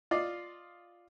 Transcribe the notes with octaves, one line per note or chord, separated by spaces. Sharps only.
F4 D5 D#5